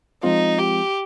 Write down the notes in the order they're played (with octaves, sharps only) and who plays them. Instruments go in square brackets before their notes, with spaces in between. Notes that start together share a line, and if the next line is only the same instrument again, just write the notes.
[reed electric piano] F3 G#3 C4 F4 [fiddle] D#4
[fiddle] G4